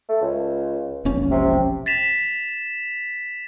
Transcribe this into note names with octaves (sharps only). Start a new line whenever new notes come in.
A3
C#2
E1 A#1 C#4
C3
A6 B6 E7 F7